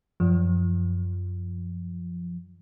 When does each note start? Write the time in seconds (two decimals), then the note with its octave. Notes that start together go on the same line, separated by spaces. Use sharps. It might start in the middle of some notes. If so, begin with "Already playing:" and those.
0.20 F#2 F3